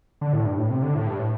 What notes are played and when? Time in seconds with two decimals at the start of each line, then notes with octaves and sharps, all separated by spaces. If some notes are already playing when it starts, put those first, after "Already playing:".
0.21 D3
0.33 A2
0.46 G2
0.58 A2
0.70 C3
0.82 D3
0.95 A2
1.07 G2
1.19 A2